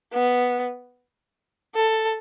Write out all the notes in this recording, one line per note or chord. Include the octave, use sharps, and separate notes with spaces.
B3
A4